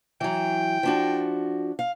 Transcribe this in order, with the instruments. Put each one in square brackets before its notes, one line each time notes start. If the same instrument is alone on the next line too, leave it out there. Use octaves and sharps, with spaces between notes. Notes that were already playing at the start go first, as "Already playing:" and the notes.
[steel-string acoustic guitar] E3 F#3 [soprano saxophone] G5
[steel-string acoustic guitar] F3 D4 F#4
F5